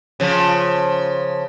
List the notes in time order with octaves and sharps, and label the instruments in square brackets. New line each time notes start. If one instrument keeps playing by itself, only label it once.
[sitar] C#3 F3